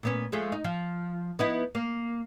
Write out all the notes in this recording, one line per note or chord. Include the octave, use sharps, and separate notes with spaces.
A#2 B3 C#4
F3 G#3 A3
D#4
F3
B3 D#4 E4
A#3